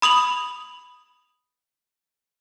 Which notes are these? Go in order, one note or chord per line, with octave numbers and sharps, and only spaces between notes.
B5 D#6 F7 F#7